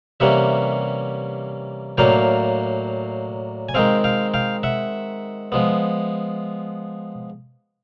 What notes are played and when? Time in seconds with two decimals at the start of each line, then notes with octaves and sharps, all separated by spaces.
0.20 C3 E3 G3 A#3 C#4 E5 F#5
1.98 A2 F#3 A#3 D4 F5 G5
3.69 G#5
3.74 D#3 G#3 C4 F5 G5
4.04 F5 G5
4.34 F5 G5
4.63 E5 F#5
5.52 F3 G#3 B3